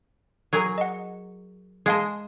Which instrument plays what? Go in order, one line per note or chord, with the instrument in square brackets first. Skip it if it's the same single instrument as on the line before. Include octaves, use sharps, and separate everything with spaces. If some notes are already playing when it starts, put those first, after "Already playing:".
[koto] F#3 G#4 A#4
[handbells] D#5 F#5
[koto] G#3 D#5 [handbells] G#4 F5 A5